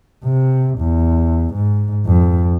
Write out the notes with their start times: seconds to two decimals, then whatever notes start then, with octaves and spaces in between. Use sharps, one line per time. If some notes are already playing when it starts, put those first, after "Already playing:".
0.24 C3
0.78 E2
1.54 G#2
2.06 F2